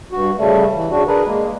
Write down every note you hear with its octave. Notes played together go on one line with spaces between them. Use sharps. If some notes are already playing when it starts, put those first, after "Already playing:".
G2 F#4
C#3 G3 A3
E3
C#3 D4 F#4
D4 G#4 A#4 B4
G#3 A#3